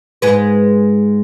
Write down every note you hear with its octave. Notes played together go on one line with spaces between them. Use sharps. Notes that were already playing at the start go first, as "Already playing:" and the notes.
G#2 G#3 B4